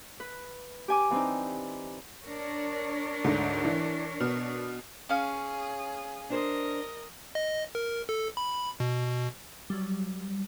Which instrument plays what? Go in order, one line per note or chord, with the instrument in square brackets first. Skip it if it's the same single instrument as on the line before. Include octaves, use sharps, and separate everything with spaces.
[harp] B4
G4 G#5 D6
E3 C4 D4 D#4
[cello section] D4 A#4 C#5
[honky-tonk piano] D2 G#2 D3
E3
B2 B3 F6
[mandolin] C#4 F5 [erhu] G#4
[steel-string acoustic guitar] D4 C5 [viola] A#4 D#5
[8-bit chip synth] D#5
A#4
A4
B5
B2
[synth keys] F#3 G3